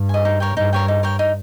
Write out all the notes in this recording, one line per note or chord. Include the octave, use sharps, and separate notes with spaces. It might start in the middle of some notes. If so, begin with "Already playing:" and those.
Already playing: G2
D#5 G#5
D#4
A#4 C#5 G5
G2 D#4
A#4 C#5 G5
D#4
A#4 C#5 G5
D#4